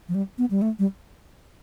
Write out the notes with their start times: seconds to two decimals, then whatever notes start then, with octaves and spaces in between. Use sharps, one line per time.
0.09 F3
0.15 G3
0.38 B3
0.51 G3
0.62 A3
0.79 G3